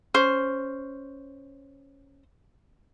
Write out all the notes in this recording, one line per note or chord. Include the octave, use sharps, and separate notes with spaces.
C#4 C5